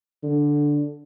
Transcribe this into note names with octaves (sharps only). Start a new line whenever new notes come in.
D3